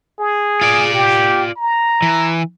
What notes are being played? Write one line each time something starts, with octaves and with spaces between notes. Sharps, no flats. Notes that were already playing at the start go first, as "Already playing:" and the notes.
G#4
F4 D5
G4
A#5
E3